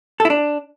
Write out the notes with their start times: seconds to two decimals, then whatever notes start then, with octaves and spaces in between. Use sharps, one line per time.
0.20 A4
0.25 E4
0.30 D4